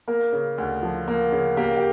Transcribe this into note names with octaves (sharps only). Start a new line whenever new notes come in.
A#3 A#4
C#3
D2
F3
A#3
C#3
A#3 G4
G4